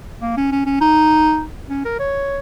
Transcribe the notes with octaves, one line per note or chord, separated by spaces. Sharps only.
A#3
C#4
C#4
C#4
D#4
C#4
A#4
C#5